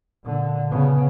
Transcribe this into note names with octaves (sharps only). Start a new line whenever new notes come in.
A#2 D3
C#3 B3